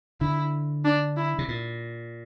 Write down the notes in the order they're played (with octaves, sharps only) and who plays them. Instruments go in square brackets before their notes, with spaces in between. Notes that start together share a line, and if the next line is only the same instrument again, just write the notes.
[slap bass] D3 [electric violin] E4
[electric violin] D4
E4
[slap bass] C3
A#2